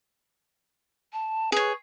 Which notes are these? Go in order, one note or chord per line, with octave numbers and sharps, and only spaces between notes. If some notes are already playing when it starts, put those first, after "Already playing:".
A5
G#4 B4 C#5